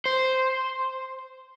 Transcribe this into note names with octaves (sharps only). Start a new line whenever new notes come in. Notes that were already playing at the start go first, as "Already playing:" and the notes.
C5